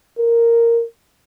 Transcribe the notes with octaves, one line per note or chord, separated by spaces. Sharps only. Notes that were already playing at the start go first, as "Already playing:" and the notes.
A#4